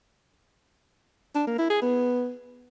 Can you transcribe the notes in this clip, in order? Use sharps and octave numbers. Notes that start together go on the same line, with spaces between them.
D4
A#3
E4
G#4
B3